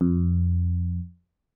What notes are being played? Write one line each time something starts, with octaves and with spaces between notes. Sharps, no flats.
F2